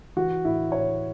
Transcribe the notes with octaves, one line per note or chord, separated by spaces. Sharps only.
E3 F#4
A2 E4
A2 C#5